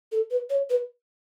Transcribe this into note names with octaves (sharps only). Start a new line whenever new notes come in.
A4
B4
C#5
B4